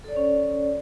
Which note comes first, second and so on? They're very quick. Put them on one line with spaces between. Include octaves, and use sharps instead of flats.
A4 D5 C#5 C#4